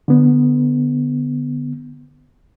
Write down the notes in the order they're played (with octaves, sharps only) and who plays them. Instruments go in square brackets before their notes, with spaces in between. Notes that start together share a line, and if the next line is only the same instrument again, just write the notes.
[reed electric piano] D3 B3